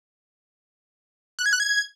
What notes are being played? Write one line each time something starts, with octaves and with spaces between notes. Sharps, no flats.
F#6
G#6
F#6
G#6